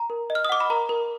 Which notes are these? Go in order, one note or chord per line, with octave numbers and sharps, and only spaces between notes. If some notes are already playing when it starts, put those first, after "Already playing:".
Already playing: A#5
A#4
D#5
F6
D#6
F#5 D6
B5
A#4 A#5
A#4